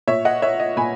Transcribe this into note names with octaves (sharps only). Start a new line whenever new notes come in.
A#2 C#5 E5
D#5 F#5
C#5 E5
D#5
A#2 G#5 B5